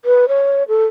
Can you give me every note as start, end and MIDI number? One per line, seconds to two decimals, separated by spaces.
0.05 0.28 71
0.28 0.64 73
0.68 0.85 69